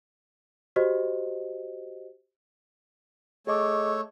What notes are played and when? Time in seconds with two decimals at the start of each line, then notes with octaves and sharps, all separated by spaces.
0.76 F#4 G4 C5 D#5
3.47 A3 G#4 C#5 D#5 D6